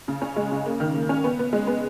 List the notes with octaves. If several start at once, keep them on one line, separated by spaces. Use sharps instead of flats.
C#3
C#4
G#3
C#3
A#3
D#3
A#3
C#4
B3
B3
G#3
B3